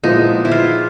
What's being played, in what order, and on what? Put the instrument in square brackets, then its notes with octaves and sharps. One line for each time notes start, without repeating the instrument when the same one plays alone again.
[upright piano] A#2 F3 G#3 B3 E4 [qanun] D#4
[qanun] E4
F4